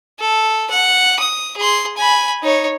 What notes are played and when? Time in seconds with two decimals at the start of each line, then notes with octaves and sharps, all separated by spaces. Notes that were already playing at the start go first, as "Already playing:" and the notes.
0.20 A4
0.70 F#5
1.20 D#6
1.57 G#4 C6
1.97 G#5 B5
2.43 D#4 C#5